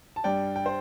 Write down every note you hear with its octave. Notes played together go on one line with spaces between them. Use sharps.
A5
G2 G3 D5 G5
G5
C5